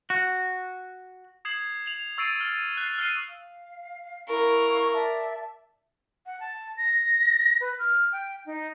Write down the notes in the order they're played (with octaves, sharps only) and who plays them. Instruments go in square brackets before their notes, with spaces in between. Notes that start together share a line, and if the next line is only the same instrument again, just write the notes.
[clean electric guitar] F#4
[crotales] D#6 G#6 C7 E7 F#7
F7 F#7
C#6 E6 A6 C7 D7 D#7
F6 A6
F#6 G#6 C7
F6 F#6 C7 D#7
[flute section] F5
[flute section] E4 F5 C#6 [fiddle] A#4
[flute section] D5 E5 A5
[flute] F#5
A5
A#6
B4
F6
G5
D#4